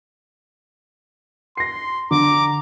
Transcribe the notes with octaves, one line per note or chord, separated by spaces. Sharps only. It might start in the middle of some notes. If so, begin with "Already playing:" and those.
C6 A#6 C7
D3 A#5 D6